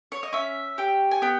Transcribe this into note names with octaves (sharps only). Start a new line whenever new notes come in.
C#5
D#5
C#4 E5
G4 G5
G#5
B3 G5